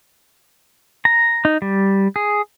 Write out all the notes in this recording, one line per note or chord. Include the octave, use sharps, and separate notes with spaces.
A#5
D#4
G3
G#4